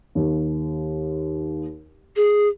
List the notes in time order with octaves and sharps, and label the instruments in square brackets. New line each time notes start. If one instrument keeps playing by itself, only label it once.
[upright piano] D#2
[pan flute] G#4